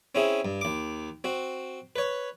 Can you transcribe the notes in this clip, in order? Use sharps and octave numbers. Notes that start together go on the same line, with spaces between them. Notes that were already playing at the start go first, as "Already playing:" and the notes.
C4 C#4 E4 G#4
G2
D#2 D6
C4 F#4
B4 C#5